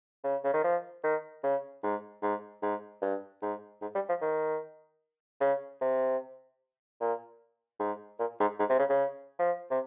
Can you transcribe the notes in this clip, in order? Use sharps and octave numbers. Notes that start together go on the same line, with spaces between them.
C#3
C#3
D#3
F3
D#3
C#3
G#2
G#2
G#2
G2
G#2
G#2
G3
F3
D#3
C#3
C3
A#2
G#2
A#2
G#2
G#2
C3
C#3
C#3
F3
C3